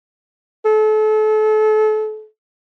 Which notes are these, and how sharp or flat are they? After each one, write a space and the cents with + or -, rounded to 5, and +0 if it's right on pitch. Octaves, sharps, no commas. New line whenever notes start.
A4 -35